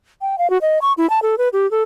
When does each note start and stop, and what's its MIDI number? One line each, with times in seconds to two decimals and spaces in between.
0.21 0.36 79
0.38 0.49 77
0.50 0.58 66
0.62 0.79 75
0.82 0.93 85
0.98 1.09 64
1.10 1.20 81
1.22 1.35 69
1.38 1.49 71
1.53 1.69 67
1.71 1.83 69